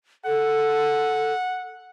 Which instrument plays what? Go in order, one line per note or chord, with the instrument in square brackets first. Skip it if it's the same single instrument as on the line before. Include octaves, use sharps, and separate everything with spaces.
[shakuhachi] A4 [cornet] F#5